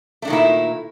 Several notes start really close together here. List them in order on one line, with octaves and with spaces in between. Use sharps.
A3 D4 D#3 A#2 E4